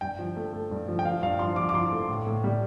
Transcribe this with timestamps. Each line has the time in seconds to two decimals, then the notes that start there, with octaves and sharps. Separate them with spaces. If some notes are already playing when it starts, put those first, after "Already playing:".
0.01 G2 G5
0.19 F3
0.36 A3
0.53 A3
0.71 G2
0.88 F3
0.99 G5
1.05 F3 F5
1.22 G2 F5
1.39 F3 C6
1.56 F3 D6
1.69 D6
1.74 F3 C6
1.92 A3
2.08 A2
2.27 A2
2.44 G3